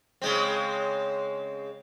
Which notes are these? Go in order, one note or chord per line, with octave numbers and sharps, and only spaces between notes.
C#3 G#3 C4